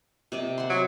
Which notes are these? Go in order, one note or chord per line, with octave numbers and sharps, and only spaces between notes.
C3 D5 D#5
F#5 C6
F#3